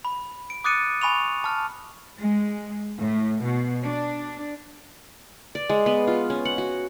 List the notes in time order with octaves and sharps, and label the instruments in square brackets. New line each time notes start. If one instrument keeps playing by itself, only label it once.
[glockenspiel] B5
D7
D6 D#6 F#6 A6 C#7 D#7
G#5 B5 C#6 F7
A5 F6
[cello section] G#3
A2
B2
D4
[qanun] D5
G#3
B3
F4
C#4
F#5
F#4